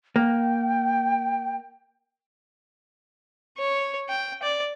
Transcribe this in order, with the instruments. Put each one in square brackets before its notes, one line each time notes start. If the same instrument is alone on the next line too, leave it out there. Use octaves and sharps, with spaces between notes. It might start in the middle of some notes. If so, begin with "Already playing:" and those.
[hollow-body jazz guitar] A#3 [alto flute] G5
[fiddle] C#5
G5
D5